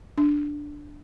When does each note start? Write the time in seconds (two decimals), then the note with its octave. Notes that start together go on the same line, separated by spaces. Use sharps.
0.18 D4